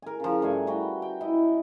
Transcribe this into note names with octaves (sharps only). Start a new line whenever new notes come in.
A#4 G#5
C#3 F3
G2 A3 G#5
F#4 B4 G5 A#5
G5
E4 D#5